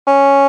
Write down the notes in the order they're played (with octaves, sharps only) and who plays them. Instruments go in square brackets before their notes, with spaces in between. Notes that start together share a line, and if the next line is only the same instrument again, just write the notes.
[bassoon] C#4